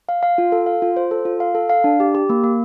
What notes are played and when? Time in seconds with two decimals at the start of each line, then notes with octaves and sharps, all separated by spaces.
0.09 F5
0.23 F5
0.38 F4
0.52 A4
0.66 F5
0.82 F4
0.97 C5
1.11 A4
1.25 F4
1.40 F5
1.55 A4
1.69 F5
1.84 D4
2.00 G4
2.15 G4
2.29 A#3
2.44 A#3